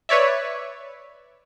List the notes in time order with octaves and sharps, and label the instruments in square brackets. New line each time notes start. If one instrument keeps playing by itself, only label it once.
[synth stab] B4 C#5 D5 E5